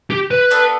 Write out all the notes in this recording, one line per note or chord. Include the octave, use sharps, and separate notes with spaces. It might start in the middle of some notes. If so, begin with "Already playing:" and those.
G4
B4
B3 D4 A4